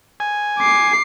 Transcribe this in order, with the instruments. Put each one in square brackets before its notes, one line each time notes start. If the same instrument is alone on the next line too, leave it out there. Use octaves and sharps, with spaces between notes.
[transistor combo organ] G#5
[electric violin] D6 C7